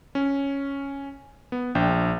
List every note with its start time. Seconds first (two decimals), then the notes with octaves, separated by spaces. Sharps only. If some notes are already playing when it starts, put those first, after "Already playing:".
0.15 C#4
1.52 B3
1.75 A#1 D4 G5 G6